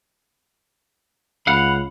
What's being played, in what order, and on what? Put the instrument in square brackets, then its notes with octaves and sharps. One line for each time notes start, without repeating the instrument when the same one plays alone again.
[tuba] C#2 [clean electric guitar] F5 F#5 [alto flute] B5